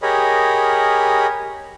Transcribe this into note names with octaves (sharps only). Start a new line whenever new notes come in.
G4 G#4 A#4 C#5 D#5 B5